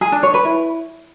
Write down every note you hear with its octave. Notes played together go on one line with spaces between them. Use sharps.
G#4
D4
C#5
B4
E4